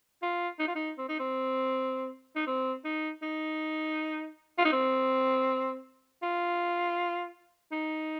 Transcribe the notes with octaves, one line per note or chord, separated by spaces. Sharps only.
F4
D#4
F4
D#4
C4
D#4
C4
D#4
C4
D#4
D#4
F4
D#4
C4
F4
D#4